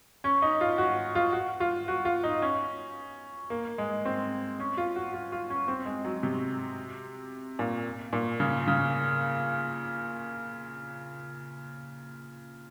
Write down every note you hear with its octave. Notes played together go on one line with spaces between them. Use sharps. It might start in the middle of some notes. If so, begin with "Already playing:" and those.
C#4
D#4
F4
F#4
F4
F#4
F4
F#4
F4
D#4
C#4
A#3
G#3
C4
C#4
F4
F#4
F4
F4
C#4
C4
G#3
F#3
C3
A#2
A#2
C#3
C#3